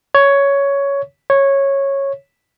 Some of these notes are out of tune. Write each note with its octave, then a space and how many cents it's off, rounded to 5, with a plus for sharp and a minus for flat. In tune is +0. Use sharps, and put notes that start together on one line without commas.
C#5 +10
C#5 -10